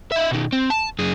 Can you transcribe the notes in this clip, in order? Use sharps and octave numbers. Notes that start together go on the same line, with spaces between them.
D#4 E5
B2 D#3
C4
A5
F#2 G#4